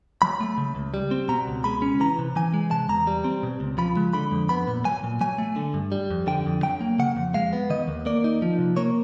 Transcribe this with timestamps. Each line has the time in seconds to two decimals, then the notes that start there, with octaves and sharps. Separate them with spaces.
0.22 F#3 B5
0.41 A3
0.58 C#3
0.75 C#2
0.94 G3
1.11 C4
1.29 B2 A#5
1.48 C#2
1.64 G#3 B5
1.82 C#4
2.00 E3 A#5
2.19 C3
2.36 E3 G#5
2.54 G#3
2.71 C3 A5
2.89 E2 A#5
3.07 G3
3.24 C4
3.43 B2
3.60 C#2
3.78 F3 B5
3.97 G#3
4.13 D3 B5
4.32 F2
4.49 B3 B5
4.67 A#2
4.85 F#3 G#5
5.04 A#2
5.21 F#3 G#5
5.38 A3
5.56 D3
5.74 G2
5.92 G3
6.11 F2
6.27 D3 G5
6.46 F2
6.63 F#3 G5
6.81 A#3
6.99 C#3 F#5
7.16 F2
7.34 G#3 F5
7.53 B3
7.70 D#3 D#5
7.88 D#2
8.06 A#3 D5
8.24 D#4
8.42 F3
8.59 C3
8.77 A#3 C#5